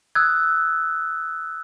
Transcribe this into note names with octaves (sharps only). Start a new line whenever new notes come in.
D#6 E6 F#6 G#6